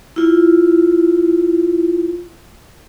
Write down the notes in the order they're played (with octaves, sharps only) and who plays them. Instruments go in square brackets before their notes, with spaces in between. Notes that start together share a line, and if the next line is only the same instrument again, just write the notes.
[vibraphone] E4 F4